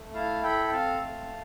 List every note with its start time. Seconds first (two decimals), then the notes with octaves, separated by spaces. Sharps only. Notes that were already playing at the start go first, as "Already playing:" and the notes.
Already playing: A3
0.14 E4 F5 A5
0.43 A4 G5 B5
0.68 G5
0.72 C4 F5 A5
1.01 A3